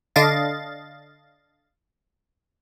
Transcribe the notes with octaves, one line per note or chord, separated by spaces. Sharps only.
D3 D4 D#5 F5 A6